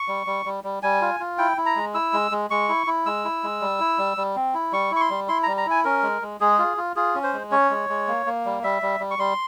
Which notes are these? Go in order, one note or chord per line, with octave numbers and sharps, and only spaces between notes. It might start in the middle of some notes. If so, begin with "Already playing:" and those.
Already playing: C#6
G3
G3
G3
G3
G3 G#5
F4
F4
E4 G5
E4
A#5
G#3
E4 E6
G#3
G#3
G#3 C#6
E4
E4
G#3 E6
E4
G#3
G3
E4
G3
G3
C4
E4
G3 C#6
E4 C#6
C6
G3
E4 C6
G3 A#5
A#5
E4 G#5
C#4 A#4
G#3
G#3
G#3 G#4
F4
F4
F4 G#4
C#4
C5
G#3
C#4 C#5
G#3
G#3
A#3
A#3
G3
G3 E5
G3
G3
C#6
G3 C6